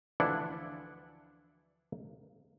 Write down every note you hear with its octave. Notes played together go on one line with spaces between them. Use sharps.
D2 E3 F3 D4 E4 F#5